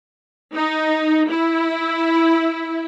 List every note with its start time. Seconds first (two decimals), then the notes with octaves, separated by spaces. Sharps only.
0.54 D#4
1.30 E4